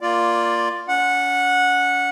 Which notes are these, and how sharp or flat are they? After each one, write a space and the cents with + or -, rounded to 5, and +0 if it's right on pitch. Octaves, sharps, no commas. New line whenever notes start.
A#3 +0 F4 +0 D5 +0
C#4 +40 F#5 -15